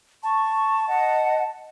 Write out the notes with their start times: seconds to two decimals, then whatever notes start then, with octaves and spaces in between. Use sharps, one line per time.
0.23 A5 C#6
0.87 D#5 F#5